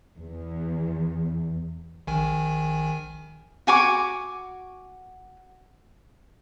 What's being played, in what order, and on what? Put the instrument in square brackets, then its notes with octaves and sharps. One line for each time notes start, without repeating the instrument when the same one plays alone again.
[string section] E2
[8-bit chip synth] A#1 D#3 G#5
[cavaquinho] F#4 G#5 C#6 D6